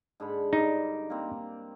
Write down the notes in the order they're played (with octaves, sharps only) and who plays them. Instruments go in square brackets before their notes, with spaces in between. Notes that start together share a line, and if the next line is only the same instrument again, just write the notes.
[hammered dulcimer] G#2 D3 B5
[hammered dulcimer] G2 D5 [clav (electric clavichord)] D#4
[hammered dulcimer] A#3 C4